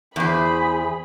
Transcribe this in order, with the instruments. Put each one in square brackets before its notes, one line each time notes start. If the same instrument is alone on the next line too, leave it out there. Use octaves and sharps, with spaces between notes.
[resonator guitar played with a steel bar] E2 C5 [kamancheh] G#4 B5